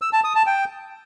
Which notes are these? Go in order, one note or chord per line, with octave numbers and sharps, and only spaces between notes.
E6
A5
D#6
A5
G5